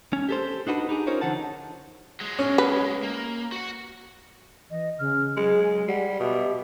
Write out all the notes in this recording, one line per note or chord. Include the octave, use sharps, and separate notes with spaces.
C#4
G4 A4 C5
D4 D#4 F#4 B4
D#4 G4 G#4
C#4 D#4 F4 A#4 C5 C#5
D3 E3 D#4 F#5 A5
F#3 G#3
C#4
B4
A#3
F#4 F#5
E3 D#5
C#3 F6
F#3 G#3 G#4
G#5
G3 F#5
B2 G4 E5